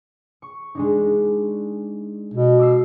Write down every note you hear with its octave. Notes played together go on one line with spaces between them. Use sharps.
C#6
G#3 D4 D#4
B2
D6 E6 C7